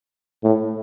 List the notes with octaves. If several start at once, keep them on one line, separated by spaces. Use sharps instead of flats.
A2